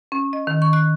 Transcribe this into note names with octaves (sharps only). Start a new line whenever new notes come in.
C#4
D#5
D#3
C#6
F#6